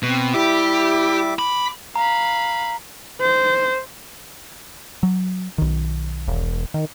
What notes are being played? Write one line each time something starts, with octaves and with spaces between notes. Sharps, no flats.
B2 C4
G3 E4 G4 E5 D6
B5 D6
F5 A#5 B5
C5
F#3
B1 D#3
E1
D#3